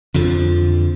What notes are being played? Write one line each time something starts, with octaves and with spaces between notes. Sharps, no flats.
F2 D3 F3